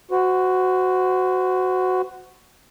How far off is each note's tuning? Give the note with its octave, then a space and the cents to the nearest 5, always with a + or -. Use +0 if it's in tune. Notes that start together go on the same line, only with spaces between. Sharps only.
F#4 +0 C5 -30